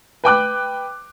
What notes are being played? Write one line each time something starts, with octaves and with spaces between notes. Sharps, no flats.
B4 G5 D6 F#6